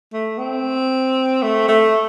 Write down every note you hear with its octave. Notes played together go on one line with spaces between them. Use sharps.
A3
C4
A3
A3